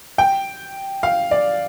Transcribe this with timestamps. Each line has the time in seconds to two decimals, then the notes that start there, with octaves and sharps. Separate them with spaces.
0.18 G5
1.03 F5
1.31 D5